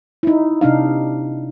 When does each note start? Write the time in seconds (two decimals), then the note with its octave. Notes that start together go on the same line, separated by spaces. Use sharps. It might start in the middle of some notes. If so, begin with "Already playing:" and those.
0.23 D#4 E4
0.61 C3 D4 D#4 F5